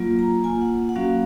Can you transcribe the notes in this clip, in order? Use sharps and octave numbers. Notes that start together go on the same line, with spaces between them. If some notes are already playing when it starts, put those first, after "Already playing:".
Already playing: F#3 A#3 F4
A#5
A#3 F4 G#5
F#5
F#5
F#3 A#3 C#4 F#4 F5